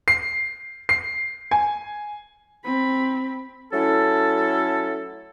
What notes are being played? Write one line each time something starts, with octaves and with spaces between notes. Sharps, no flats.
C7
C7
G#5
C4 B5
F#3 A3 C#4 E4 A4